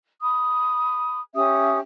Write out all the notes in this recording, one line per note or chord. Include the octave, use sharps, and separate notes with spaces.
B5 D#6
C#4 G4 E5 D#6